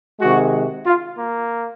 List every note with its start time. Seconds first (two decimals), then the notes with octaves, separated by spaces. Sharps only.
0.20 C3 D#3 G#3 F#4
0.86 F4
1.17 A#3